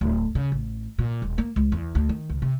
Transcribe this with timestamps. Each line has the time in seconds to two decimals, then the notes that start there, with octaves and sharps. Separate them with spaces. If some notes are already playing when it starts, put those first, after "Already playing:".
0.01 D1
0.35 C#3
0.52 A1
0.98 A#2
1.22 D#1
1.38 A#3
1.56 C#2
1.72 E2
1.95 D2
2.09 D#3
2.30 C#2
2.42 C3